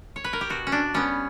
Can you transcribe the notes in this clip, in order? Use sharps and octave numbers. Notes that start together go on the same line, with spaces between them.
C#5
B4
A#4
G4
B2 F#4
C#4
D4
G3 B3 C#4